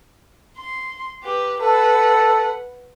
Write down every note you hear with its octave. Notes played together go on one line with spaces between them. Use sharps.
C6
G4 B4
A4 B4 F#5